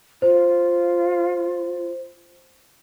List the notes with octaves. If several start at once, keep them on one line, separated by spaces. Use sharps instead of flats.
F4 C5